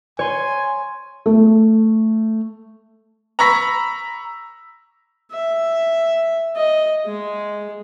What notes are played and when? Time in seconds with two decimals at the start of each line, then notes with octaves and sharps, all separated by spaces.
0.19 C#5 G#5 C6
1.26 A3
3.39 A#5 B5 C#6 E6 A#6 B6
5.32 E5
6.56 D#5
7.06 G#3